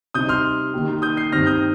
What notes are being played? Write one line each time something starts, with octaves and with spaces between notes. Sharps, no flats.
C3 G3 D#4 D#6 G6
C6 F6
D#3 A#3 G4
D#6 G6
G6 C7
G2 D#3 C4 F6 A#6
D#6 G6